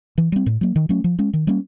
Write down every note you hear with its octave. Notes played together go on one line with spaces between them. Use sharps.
E3
G3 C4
A2
F#3 A#3
D#3
F#3 A3 C#4
F3
G#3 C#4
D#3
G3 A#3 C#4